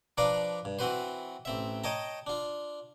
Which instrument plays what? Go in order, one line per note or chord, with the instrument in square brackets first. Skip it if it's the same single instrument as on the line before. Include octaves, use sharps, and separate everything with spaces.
[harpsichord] F3 D4 B4 D5 F5 A#5
G2
E3 C4 F#4 B4 C5
A1 C4 E5
C#5 D#5 G5 A5 A#5
D4 F4